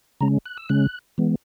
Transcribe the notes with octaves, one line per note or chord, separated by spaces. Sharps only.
C#3 G#3 C#4 A#5
F#6
E6
C#3 G#3 C#4 F#6
E3 G#3 B3